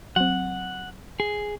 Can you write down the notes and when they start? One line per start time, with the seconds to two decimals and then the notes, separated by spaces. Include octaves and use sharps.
0.16 F#3 C4 F#5
1.20 G#4